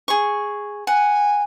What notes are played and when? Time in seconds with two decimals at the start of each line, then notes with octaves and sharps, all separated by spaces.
0.08 G#4 C#6
0.87 F#5 G#5